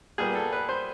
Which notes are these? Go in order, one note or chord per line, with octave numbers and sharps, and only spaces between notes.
A#2 G3 B3 G#4
A4
B4
C5